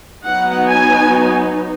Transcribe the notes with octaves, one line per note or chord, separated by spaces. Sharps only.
F#3 B3 D#4 F#5
G#5